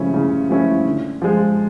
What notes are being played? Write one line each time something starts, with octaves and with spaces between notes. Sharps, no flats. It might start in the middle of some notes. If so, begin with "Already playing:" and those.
Already playing: C#3 F3 A3 C#4 E4
C#3
F3 A3 C#4 E4
D3
F3 G#3